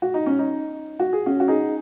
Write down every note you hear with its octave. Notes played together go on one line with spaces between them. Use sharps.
F#4
D#4
C#4
D#4
F#4
G#4
C#4 F#4
F#4
D#4 G#4